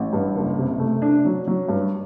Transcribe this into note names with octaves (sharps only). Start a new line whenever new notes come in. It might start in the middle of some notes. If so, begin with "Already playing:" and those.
Already playing: A1
G2
F#1
C3
A3
D4
F#3
F#3
G2